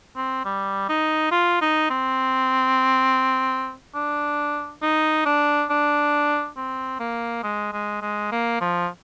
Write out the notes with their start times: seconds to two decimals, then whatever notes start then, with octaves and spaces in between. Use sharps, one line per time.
0.16 C4
0.45 G3
0.89 D#4
1.32 F4
1.62 D#4
1.90 C4
3.95 D4
4.82 D#4
5.26 D4
5.70 D4
6.57 C4
7.00 A#3
7.44 G#3
7.73 G#3
8.02 G#3
8.32 A#3
8.61 F3